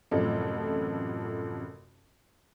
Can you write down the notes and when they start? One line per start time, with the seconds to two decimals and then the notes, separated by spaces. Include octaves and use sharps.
0.11 A1 F#2 C3 F3 A4